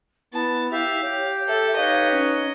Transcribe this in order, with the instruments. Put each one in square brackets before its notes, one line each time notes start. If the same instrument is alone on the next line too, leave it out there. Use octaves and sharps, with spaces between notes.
[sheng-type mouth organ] B3 [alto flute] E4 [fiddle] A5
[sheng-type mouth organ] G4 E5 [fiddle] F5
[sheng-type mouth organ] G4 [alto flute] C#5
[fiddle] A4 [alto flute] E5
[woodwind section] D#4 B4 C#5 [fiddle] D#5 [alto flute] F5
[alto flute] C#4